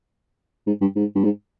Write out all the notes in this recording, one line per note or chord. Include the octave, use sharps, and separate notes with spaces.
G#2
G2
G#2
G2
G#2